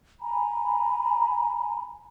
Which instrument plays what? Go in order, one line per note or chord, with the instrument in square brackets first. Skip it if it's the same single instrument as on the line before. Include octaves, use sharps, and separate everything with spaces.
[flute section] G#5 A#5 B5